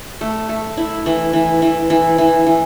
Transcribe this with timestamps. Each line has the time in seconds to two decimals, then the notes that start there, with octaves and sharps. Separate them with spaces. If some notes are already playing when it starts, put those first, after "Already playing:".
0.21 A3
0.49 A3
0.77 E4
1.06 E3
1.33 E3
1.62 E3
1.90 E3
2.18 E3
2.46 E3